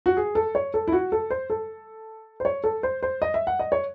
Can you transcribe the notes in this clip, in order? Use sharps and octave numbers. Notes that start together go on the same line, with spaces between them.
F#4
G#4
A4
C#5
A4
E4
F#4
A4
C5
A4
C5
C#5
A4
C5
C5
D#5
E5
F#5
D#5
C#5